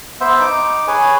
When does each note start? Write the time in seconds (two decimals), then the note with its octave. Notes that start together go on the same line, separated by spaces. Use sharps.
0.21 B3 C5 E5
0.40 D#4 D6
0.88 G#4 B4 C#5 G#5